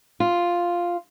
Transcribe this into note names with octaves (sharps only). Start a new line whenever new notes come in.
F4